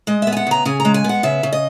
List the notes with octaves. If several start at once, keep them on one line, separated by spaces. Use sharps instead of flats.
G#3 D#5
B3 E5
G#5
F#5
C#3 A#5
C#3 G#5
A#5
G#3
G#5
B3 F#5
C#3 E5
C#3
D#5